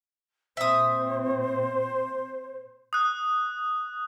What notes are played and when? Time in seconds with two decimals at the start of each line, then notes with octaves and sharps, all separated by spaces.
0.57 A#2 C4 C5 E5 D#6
2.93 D#6 F#6